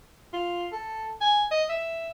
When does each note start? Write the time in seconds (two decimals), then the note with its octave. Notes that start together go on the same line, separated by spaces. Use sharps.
0.33 F4
0.72 A4
1.21 G#5
1.51 D#5
1.69 E5